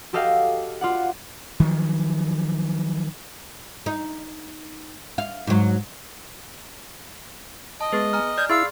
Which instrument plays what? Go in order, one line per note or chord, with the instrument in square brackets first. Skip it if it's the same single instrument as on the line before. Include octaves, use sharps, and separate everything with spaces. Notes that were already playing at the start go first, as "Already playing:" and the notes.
[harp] F#4 G4 A4 D#5 F5 G5
F4 D5 F#5
[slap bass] D#3 F3 F#3
[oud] D#4
F5
G#2 F#3
[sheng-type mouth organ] D#5 [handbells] A5
[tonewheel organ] G#3 [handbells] B3 G#4 B4
[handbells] G#5 A#5 F6
[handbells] D5 F6 [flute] G6 [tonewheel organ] G#6
[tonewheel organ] E4 [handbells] G#4 B5 C6 [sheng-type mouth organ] F5 [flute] E6